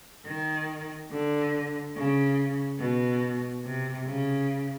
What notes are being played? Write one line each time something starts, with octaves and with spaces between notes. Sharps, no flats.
D#3
D3
C#3
B2
C3
C#3